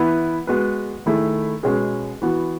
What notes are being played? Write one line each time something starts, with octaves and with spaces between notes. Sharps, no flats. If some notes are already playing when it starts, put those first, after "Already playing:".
Already playing: E3 B3 E4 B4
G#3 B3 F#4 B4
D#3 A3 E4 G#4
B2 G#3 C#4 G#4 B4
E3 B3 F#4